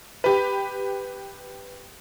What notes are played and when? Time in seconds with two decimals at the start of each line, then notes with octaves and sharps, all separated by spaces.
0.24 G4 B4